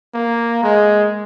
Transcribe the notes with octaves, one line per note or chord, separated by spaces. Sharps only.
A#3
G#3